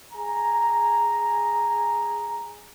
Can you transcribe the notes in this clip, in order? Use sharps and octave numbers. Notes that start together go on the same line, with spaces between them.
G#4 G#5 A#5